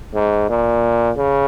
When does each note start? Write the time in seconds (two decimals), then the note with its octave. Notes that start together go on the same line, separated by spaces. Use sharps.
0.14 G#2
0.49 A#2
1.18 C#3